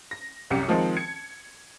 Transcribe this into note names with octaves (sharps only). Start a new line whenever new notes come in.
A#6
C2 F#2 G4 C#7
D#3 F3 G#3 C4
G#6 C#7